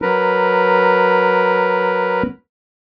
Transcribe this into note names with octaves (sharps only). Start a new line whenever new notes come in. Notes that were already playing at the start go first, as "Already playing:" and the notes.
F#3 A#4 B4